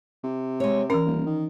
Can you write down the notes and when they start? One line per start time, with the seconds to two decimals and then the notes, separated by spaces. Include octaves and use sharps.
0.24 C3
0.60 G#3 C#5
0.90 E3 C#4 A#4
1.06 D#1
1.26 D#3